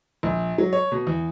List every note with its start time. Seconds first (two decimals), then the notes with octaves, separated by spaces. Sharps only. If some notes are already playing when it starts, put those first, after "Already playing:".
0.23 A#1
0.58 F#3
0.73 C#5
0.92 B2
1.07 E2